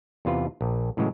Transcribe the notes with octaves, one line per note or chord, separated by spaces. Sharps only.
E2 C3 F4 B4
A#1
A2 C#3 E3 F#3 G#3